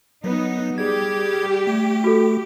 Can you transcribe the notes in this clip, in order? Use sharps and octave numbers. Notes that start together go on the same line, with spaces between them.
F#3 B3 D#4
G3 G4 G#4 G#6
A3
F#4 A4